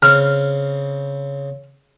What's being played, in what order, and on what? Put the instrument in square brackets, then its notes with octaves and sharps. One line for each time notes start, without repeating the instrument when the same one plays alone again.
[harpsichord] C#3 C4 [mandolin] F6